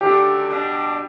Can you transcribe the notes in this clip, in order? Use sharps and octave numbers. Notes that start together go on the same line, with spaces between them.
F#2 D3 A3 D4 G4 A4
B2 G3 D4